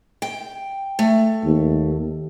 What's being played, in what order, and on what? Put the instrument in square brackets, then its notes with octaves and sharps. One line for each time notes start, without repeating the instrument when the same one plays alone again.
[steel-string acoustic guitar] G5
A3
[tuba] D#2